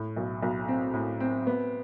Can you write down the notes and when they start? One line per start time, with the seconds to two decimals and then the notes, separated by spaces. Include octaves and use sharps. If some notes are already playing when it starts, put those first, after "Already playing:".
Already playing: A2
0.17 B1
0.43 B1
0.68 C4
0.94 A2
1.20 C4
1.47 B3